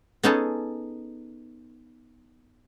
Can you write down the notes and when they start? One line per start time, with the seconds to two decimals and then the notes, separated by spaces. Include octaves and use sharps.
0.23 B3 C#4 D#4 G#4 A4 A5